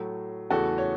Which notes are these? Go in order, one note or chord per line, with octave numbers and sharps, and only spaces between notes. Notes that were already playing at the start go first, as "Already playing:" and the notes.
Already playing: A2 F#3 A3
E2 C#3 E3 A3 F#4 A4
C#5